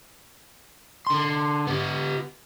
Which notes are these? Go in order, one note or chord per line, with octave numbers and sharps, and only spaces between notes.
D3 C6
B3 G4